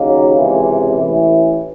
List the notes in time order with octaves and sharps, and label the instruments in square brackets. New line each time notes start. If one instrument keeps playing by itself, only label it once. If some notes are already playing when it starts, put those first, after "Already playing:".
Already playing: [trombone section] D#2 C#3 F#3 A#3 D#4
C#2 C3 E3
A1 A2 E3